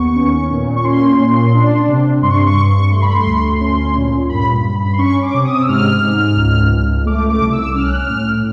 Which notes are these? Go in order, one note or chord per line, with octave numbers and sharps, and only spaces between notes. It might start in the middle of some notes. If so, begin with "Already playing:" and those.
Already playing: D#2 B3 C#6
C#4
A#2
C#6
C#4 C6
A#2
D4
C3
G2 C6
C#6
C6
C#6
G2
C#6
A3 C6
B5
C6
D2
C#4
A#2
G2 B5
G2
B5
C6
C#4 C#6
D6
C3
D#6
E6
G#2 F6
G#2
C#2
C#2
A3 D6
D6
C2
E6
C#4 F6
F#6
F6
A2